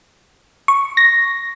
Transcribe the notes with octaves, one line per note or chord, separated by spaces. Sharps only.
C#6
A#6